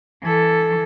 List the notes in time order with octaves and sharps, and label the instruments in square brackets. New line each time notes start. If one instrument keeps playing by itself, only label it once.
[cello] E3 A4